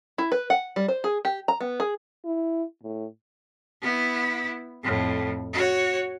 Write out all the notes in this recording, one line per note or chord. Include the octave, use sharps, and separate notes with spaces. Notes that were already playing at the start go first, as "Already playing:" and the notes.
E4
B4
F#5
G3
C5
G#4
G4
A#5
B3
G#4
E4
A2
B3 E4
F2 A2
F#4 C#5